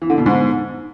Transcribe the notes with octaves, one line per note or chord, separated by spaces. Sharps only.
E3
D3
B2
G#2